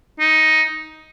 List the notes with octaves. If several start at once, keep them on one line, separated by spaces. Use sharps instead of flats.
D#4